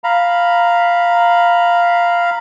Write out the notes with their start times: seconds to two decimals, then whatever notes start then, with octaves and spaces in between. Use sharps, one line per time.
0.04 F5 A#5 B5